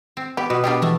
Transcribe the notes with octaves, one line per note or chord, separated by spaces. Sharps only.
C4
B3 G4
B2 F#4 B4
G3 B3 D4 F4 G4
E3 G#3 A3